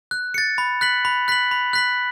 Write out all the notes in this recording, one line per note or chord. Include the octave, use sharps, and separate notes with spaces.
F#6
A6 C#7
B5
F#6 B6 F#7
B5
F#6 B6 F#7
B5
F#6 B6 F#7